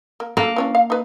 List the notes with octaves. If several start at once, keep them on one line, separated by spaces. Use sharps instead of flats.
A#3
D3 A3 A#3
E3 C#4 D4
F5
D#4 B4